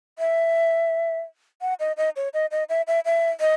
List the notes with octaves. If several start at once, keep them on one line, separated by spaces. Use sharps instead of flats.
E5
F#5
D#5
D#5
C#5
D#5
D#5
E5
E5
E5
D#5